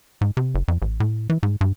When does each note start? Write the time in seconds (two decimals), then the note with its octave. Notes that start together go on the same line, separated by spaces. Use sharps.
0.21 G#2
0.37 C3
0.54 F#1
0.68 F2
0.82 A1
1.00 A2
1.30 E3
1.43 G#2
1.61 G2